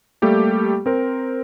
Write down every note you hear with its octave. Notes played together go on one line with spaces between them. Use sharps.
G3 A3 A#3 G4 A4
C4 A#4 C5